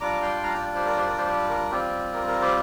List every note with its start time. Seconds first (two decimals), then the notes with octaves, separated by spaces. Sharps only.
0.01 G3 D4 F4 A#5 D6
0.22 G5 C6
0.43 F5 A#5
0.54 D5 G5
0.75 G4 C5
0.86 A#4 D5
0.96 G4 C5
1.06 A#4 D5
1.18 G4 C5
1.28 G4
1.49 A#4
1.71 G3 C4 F4 G4
2.13 A#4
2.27 A#4
2.42 G4 C5